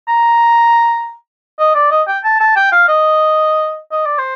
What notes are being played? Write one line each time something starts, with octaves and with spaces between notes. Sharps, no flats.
A#5
D#5
D5
D#5
G5
A5
A5
G5
F5
D#5
D#5
D5
C5